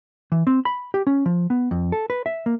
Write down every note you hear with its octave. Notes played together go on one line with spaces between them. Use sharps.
E3
C4
B5
G4
C#4
F3
B3
F2
A4
B4
E5
A#3